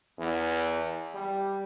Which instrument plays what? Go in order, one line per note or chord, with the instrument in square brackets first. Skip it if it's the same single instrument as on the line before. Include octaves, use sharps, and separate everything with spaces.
[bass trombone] E2
G3